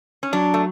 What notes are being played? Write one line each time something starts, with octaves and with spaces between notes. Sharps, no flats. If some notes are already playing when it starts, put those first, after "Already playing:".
C#4
F#3 D4
A3